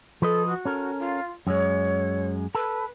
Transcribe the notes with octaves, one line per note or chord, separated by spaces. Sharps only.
F3 A4 B4 D#5
F#4
C#4 A4 A#4
F4
F#2 G#3 C#5
A4 B4